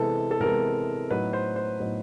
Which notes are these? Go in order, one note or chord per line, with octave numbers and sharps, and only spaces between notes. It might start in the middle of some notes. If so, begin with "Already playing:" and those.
Already playing: C3 E3 G#3 B3 A4
A4
C3 E3 G#3 B3 A#4
A2 F#3 B3 D#4 B4
C5
C5
A2 F#3 B3 D#4